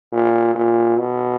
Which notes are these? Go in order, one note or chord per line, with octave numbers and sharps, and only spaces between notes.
A#2
A#2
B2